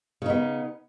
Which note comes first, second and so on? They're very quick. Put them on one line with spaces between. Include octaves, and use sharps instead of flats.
C#3 D#4 B3